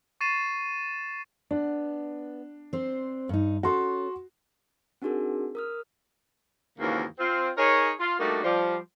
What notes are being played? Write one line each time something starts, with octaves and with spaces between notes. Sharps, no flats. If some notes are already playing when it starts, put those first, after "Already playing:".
C#6 A6 C7 D#7 E7
B3 D4
C4 C5
G2 D#4
C#4 F#4 A4 C6
C4 D4 D#4 F#4 G#4 A#4
A#4 D#6 F6
D#2 G#2 C#3 E3 A#3 F#4
C4 F4
D#4 G#4 A#4 C#5
F4
G3 A3 A#3 D4 D#4 F#4
F3 G3 C5